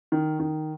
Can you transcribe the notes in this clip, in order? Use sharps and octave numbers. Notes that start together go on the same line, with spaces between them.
D#3
D#3